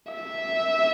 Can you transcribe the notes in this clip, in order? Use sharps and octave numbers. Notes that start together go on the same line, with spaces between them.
E5